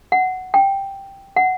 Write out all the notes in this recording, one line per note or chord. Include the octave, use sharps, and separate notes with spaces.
F#5
G5
F#5